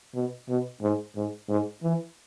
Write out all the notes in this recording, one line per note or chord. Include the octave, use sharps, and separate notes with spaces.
B2
B2
G#2
G#2
G#2
E3